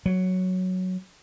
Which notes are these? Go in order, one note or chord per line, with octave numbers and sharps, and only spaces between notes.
F#3